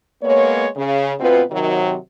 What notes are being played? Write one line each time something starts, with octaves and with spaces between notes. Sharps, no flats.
G#3 A#3 B3 C#5
C#3
D2 B2 B3 C4 F4 B4
C3 D#3 F#3